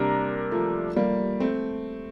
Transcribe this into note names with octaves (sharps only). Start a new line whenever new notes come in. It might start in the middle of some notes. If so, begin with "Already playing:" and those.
Already playing: C3 G3 A#3 D4 A#4
F3 A3
G3 A#3
A3 C4